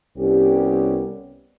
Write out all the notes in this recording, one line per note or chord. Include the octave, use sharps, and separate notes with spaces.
C2 B3 C#4 G4